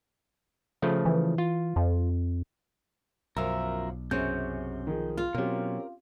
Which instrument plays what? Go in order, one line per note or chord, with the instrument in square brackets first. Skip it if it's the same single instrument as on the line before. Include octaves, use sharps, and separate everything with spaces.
[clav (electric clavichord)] C#3 F3 A3
[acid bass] E3
[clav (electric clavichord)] F4
[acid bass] F2
[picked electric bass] B1 [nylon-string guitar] F#2 F3 [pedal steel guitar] A#4 E5
[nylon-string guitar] F#2 C3 C#4 [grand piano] G#4 [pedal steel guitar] G6
[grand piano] D#3 F3 G#4
[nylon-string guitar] F4
[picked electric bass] B2 F#3 [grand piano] C4 C#4 G4 [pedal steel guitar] A#4